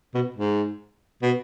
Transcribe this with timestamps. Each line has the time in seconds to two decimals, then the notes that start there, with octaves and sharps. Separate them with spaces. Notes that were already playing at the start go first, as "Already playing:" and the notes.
0.14 B2
0.36 G#2
1.22 B2